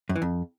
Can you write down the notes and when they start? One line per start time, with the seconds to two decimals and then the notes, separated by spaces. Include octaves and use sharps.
0.09 F#2
0.16 E3
0.22 F2